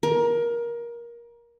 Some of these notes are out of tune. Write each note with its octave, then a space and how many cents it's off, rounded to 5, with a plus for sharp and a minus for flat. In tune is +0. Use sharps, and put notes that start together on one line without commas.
A#4 +20